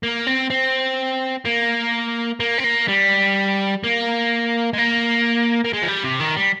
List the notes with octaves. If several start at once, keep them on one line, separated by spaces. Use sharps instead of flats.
A#3
C4
C4
A#3
A#3
C4
A#3
G3
A#3
G#3
A#3
A#3
G#3
F3
G3
C3
D#3
G3